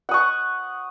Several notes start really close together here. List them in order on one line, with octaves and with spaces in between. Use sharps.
F#5 D#6 C#6